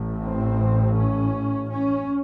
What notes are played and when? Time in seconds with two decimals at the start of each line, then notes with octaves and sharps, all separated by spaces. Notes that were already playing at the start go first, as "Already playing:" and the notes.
Already playing: A1 A2
0.22 C4
0.96 C#4
1.70 C#4